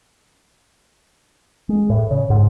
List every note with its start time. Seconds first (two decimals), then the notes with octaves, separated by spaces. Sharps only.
1.69 G#3
1.90 A2
2.11 C#3
2.30 G#2